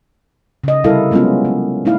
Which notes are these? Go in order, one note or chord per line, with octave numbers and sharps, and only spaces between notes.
C#3 D#5
C3 G3 E4 A4 A#4 F5
F#3 G#3 B3 C#4 F4
A#3
A3 D#4 E4 F5